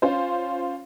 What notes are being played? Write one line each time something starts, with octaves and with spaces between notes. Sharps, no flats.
C#4 F4 C5